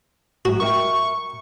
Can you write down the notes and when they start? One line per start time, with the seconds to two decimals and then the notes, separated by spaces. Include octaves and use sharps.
0.45 A2 F#3 F#4
0.60 A#4 E5 G5 C#6